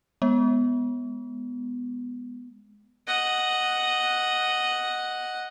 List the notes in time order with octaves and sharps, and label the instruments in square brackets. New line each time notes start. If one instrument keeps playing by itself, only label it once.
[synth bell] G#3 B3
[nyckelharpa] D#5 F#5